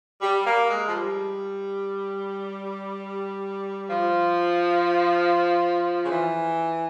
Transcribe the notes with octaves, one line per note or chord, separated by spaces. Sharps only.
G3
A#3
G#3
F3
G3
F3
C#3
E3